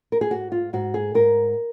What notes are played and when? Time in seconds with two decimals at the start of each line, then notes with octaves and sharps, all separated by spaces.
0.12 A#4
0.21 G#4
0.31 G#2 F#4
0.52 F4
0.73 G#2 F#4
0.94 G#4
1.14 G#2 A#4